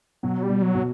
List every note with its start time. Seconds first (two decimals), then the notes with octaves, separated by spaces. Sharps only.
0.23 B2 F#3
0.43 G3
0.49 B2
0.62 F#3
0.75 B2